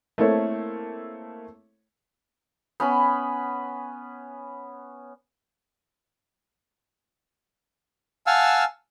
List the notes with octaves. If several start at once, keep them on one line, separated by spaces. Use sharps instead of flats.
A3 A#3 C4 E4 A4 C#5
B3 C#4 B5
F5 F#5 G#5 A5 E6 F6